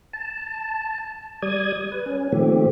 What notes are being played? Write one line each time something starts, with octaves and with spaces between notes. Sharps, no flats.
A5
G3 D5 D#6 G#6
B4
C#4
A#2 D#3 F3 A3 C4 G4